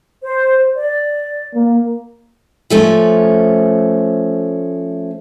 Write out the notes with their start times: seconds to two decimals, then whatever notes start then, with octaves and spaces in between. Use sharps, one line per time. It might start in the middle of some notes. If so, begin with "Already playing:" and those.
0.22 C5
0.76 D5
1.55 A#3
2.70 F3 A3 C#4